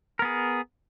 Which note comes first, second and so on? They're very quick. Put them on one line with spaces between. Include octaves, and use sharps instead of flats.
A#4 B3 G#4